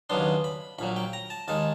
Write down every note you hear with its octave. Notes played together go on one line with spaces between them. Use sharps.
D#2 C#3 F#3 B3 D4 C6
B5
A#1 A#2 F#3 B5
G5
A#5
A5
D#2 D#3 G#3 A5